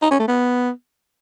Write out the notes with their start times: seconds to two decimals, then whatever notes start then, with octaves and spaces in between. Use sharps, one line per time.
0.02 D#4
0.11 C#4
0.19 A3
0.28 B3